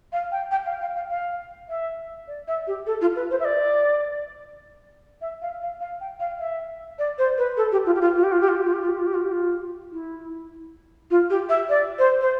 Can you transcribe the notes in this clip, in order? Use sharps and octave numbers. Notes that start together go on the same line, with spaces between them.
F5
G5
G5
F5
F5
F5
F5
E5
D5
E5
G4
A4
F4
B4
C5
E5
D5
E5
F5
F5
F5
G5
F5
E5
D5
C5
B4
A4
G4
F4
G4
F4
F4
G4
F4
G4
F4
G4
F4
G4
F4
G4
F4
G4
F4
G4
F4
E4
F4
G4
E5
D5
C5
C5